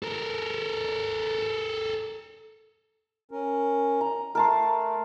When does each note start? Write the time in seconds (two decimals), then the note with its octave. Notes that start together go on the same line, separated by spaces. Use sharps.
0.03 A4 A#4
3.31 C#4 A#4
4.01 A#5
4.35 A3 A#4 A5 C6